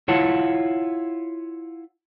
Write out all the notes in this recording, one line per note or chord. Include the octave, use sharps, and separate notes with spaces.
E4 F4 C#5 F#5 A5